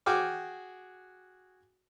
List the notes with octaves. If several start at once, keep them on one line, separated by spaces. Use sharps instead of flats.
F#4 G#4 G5 D6 F6